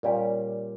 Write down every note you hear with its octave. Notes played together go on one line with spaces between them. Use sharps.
A#2 G3 C#4 G4